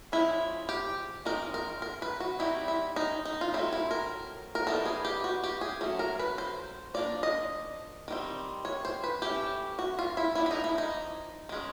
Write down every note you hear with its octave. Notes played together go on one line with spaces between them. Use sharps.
F3 G#3 C#4 E4
G4
D#3 G#3 C4 D#4 A#4
A#4
A#4
B4
F#4
G3 C4 D#4 E4
E4
D#4
D#4
F4
F#3 A3 C4 D#4 E4
E4
A#4
A#4
E3 G3 B3 D#4 A4
G#4
G4
F#4
G4
G#4
F#3 A3 C#4
A#4
B4
C5
F3 A#3 D4 D5
D#5
D#3 G3 C4
C#5
C5
B4
E3 A3 C#4 G4
F#4
F4
E4
F3 A#3 D4 E4
E4
D#4
E4
D#4
D#3 G#3 C#4